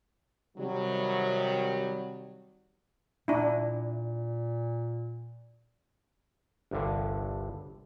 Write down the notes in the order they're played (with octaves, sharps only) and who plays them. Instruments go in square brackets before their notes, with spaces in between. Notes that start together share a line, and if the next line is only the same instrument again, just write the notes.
[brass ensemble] C3 D#3 F#3 G3
[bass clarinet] A#2 [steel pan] D4 E4
[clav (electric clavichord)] G1 C2 G2 D3